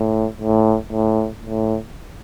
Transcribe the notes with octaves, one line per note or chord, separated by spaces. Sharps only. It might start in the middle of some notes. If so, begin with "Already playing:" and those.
Already playing: A2
A2
A2
A2